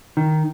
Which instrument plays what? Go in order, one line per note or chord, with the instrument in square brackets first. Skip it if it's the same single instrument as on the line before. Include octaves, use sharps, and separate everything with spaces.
[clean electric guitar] D#3